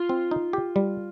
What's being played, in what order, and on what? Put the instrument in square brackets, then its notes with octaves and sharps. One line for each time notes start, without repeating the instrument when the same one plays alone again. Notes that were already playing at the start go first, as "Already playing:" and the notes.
Already playing: [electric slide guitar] F4
[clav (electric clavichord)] C4
D#4
G4
G3